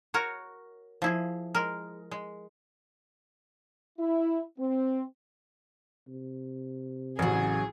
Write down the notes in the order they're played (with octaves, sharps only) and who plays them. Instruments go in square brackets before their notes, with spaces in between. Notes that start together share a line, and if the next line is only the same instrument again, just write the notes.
[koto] F#4 A#4 C#5
F3 E4 G#4
G#3 A#4
G#3
[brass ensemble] E4
C4
[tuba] C3
[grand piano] A1 [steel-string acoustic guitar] C#3 F#3 [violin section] G#4